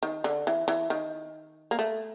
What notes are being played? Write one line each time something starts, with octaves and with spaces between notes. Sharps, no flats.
D#3
D3
E3
E3
D#3
A#3
A3